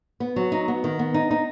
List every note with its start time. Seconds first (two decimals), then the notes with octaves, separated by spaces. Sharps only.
0.20 B3
0.36 F#3
0.52 D#4
0.68 B3
0.84 D#3
0.99 B3
1.14 D#4
1.31 D#4